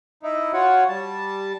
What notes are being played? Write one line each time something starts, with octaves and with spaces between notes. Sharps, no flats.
D#4 E4
F4 F#4 C#5 F#5
G3 A5